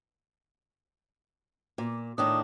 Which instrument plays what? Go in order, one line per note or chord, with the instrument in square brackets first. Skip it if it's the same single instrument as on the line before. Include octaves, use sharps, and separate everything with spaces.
[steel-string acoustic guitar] A#2
[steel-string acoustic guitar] A2 D#3 D4 [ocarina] D#6